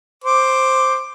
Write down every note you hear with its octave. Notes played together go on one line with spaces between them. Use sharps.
C5 D6